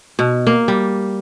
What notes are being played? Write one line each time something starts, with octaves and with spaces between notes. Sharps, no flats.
B2
A#3
G3